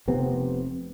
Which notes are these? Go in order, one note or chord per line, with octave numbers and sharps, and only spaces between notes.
F1 C3 B3 C4